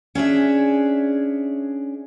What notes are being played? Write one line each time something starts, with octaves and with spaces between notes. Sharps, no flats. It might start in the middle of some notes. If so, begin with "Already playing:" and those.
C#4 D4 G#4 E5